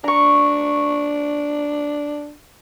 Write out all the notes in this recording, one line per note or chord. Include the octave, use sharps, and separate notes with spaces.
D4 A#5 C#6